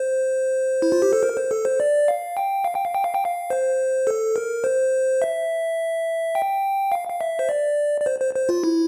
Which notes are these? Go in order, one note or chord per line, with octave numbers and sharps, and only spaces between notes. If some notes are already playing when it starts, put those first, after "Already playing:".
Already playing: C5
E4
F4
G4
A4
A#4
C5
A4
C5
D5
F5
G5
F5
G5
F5
G5
F5
G5
F5
C5
A4
A#4
C5
E5
G5
F5
F5
E5
C5
D5
D5
C5
C5
C5
F4
E4